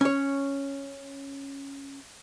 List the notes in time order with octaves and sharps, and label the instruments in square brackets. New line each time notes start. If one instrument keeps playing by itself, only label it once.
[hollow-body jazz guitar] C#4 C#5